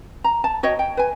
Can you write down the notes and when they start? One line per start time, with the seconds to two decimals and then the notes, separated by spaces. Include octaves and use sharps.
0.24 A#5
0.44 A5
0.63 F#4 C#5 D#5 G5
0.79 G5
0.97 B4 G#5